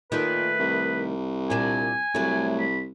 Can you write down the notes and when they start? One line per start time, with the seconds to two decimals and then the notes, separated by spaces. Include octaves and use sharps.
0.12 A#2 D#3 A3 B4
0.60 C2
1.50 A#2 D4 G#5
2.15 C2 F#3 A3
2.59 B5